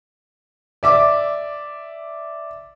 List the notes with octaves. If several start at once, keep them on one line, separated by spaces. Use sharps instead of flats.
D5 E5 D6